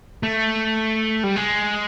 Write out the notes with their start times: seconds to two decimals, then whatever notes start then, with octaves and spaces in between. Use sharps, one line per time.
0.23 A3
1.24 G3
1.36 G#3